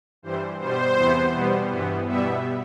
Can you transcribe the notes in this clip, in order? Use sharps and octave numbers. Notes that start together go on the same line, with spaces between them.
G2 E3 G3 C5
B2 G3 B3 C5
E2 C3 E3 B3
B2 G3 B3
G2 E3 B3
B2 G3 B3 E5